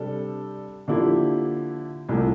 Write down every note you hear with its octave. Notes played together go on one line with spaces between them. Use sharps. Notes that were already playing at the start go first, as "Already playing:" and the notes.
Already playing: C3 G3 D4 A4
D3 F3 A#3 E4 G4
C2 A#2 A3 E4